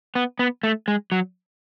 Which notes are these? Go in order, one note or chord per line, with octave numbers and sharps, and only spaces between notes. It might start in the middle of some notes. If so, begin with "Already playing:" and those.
B3
B3
A3
G#3
F#3